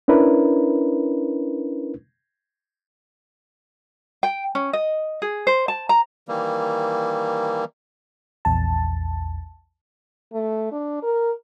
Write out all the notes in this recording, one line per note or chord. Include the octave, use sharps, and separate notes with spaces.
C#4 D4 E4 A#4 B4
G5
C#4
D#5
G#4
C5
A5
A#5
D#3 E3 G3 A#3
A#1 E2 A5
A3
D4
A#4